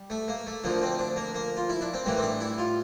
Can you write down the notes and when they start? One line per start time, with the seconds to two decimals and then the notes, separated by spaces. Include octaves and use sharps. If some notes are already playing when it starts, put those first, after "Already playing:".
Already playing: G3
0.10 A3
0.28 A#3
0.47 A3
0.64 D2 D3 F3 A#3
0.82 C4
0.99 D4
1.16 A#3
1.34 A#3
1.57 F4
1.69 E4
1.81 D4
1.94 C4
2.06 A2 E3 G3 A#3
2.17 C4
2.23 D4
2.40 E4
2.58 F4